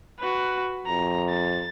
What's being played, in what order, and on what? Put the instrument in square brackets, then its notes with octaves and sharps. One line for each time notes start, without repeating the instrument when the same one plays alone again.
[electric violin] F#4 B4
[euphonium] F2 [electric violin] A#5
[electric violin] A6